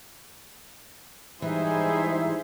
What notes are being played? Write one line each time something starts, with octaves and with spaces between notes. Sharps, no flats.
G#2 E3 G3 D#4 E4 G#4 C5 E5